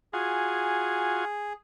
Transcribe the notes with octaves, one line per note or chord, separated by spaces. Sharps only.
F4 F#4 G#4 G#5